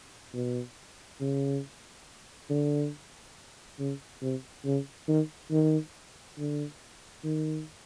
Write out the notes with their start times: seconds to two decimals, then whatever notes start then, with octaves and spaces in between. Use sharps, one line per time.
0.34 B2
1.20 C#3
2.50 D3
3.79 C#3
4.21 C3
4.65 C#3
5.08 D#3
5.51 D#3
6.38 D3
7.24 D#3